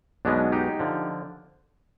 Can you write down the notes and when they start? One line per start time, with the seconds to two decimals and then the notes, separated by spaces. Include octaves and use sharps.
0.25 B1 B2 G#3 B3 D4
0.52 D#4 G4
0.79 D3 F3